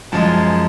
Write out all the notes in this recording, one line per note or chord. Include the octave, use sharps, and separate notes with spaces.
F#2 F3 G#3 A5